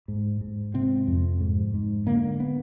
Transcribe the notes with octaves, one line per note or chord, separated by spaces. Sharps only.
G#2
G#2
C3 C4
F2
G#2
G#2
D3 A#3
B3